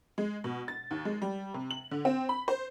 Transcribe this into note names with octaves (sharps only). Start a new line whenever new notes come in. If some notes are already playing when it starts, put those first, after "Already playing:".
G#3
B2
A6
D#2
G#3
G3
C3
F#7
D3
C4
B5
C5